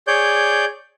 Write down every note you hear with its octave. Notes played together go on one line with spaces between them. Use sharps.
G#4 C#5 D5 G6